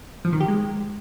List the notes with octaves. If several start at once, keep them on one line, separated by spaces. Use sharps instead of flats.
F3
D#3
G4
G#3